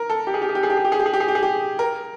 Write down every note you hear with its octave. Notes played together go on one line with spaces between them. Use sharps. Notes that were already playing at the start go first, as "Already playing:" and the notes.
Already playing: A#4
A4
G4
G#4
G4
G#4
G4
G#4
G4
G#4
G4
G#4
G4
G#4
G4
G#4
G4
G#4
G4
A#4